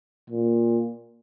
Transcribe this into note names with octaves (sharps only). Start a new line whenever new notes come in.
A#2